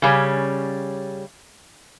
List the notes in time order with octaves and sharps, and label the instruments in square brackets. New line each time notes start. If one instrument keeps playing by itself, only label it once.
[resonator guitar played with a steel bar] C#3 G3 C#4